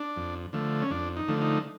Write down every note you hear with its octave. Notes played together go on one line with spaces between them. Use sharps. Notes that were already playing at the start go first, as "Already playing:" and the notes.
Already playing: D4
F2
D3 F3 A3
C#4
F2 D4
D#4
D3 F3 A3
D#4